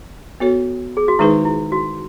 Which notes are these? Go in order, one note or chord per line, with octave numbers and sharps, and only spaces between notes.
B3 F#4 A4 C#5
G#4
F#4
D#3 G#3 D#4 E4 G#4 B4
E4
F#4